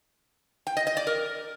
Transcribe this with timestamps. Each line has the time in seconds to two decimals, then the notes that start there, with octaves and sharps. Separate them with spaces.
0.67 G5
0.77 D#5
0.87 D#5
0.97 D5
1.07 A#4